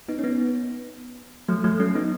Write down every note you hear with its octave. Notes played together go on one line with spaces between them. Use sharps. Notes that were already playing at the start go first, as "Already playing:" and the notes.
B3 D#4
C#4
B3 D#4
F#3 A3
F#3 A3
A3 C#4
B3 D#4